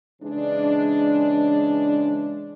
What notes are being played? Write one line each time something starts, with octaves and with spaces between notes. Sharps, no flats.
C#3 E3 G#3 D4